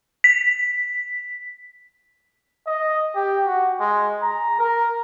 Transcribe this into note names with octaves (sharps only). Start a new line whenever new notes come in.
B6
D#5
G4
F#4
G#3
A#5
A#4